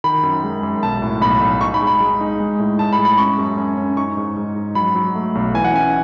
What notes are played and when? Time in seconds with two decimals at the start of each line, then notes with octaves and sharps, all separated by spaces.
0.04 D#3 B5
0.23 F#2
0.44 G#3
0.63 F#2
0.82 B1 A5
1.02 A2
1.21 B1 B5
1.41 B1
1.61 D#4 C#6
1.74 B5
1.81 G#3
1.87 B5
2.00 G#3
2.21 D#4
2.40 G#3
2.60 A2
2.79 A2 A5
2.93 B5
2.99 G#3
3.05 B5
3.18 C#4 C#6
3.38 F#2
3.57 C#4
3.77 C#4
3.97 D#4 C#6
4.17 G#2
4.37 G#2
4.56 D#4
4.75 F#3 B5
4.95 F#3
5.15 A3
5.35 B1
5.54 E3 G#5
5.65 F#5
5.74 C#4 G#5